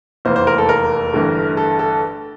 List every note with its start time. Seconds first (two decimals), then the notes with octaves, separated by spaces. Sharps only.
0.25 F1 E2 E3 A#3 C5
0.36 C5
0.47 A#4
0.58 A4
0.69 A#4
1.13 G1 G2 E3 A3
1.57 A4
1.79 A4